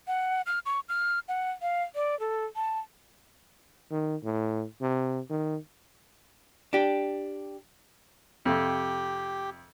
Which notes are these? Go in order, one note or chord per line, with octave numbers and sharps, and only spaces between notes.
F#5
F6
C#6
F6
F#5
F5
D5
A4
A5
D#3
A2
C3
D#3
D4 G4
F2 C3 G4